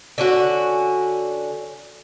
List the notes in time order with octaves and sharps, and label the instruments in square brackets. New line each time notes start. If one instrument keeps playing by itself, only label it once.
[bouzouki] D3 C#4 F#4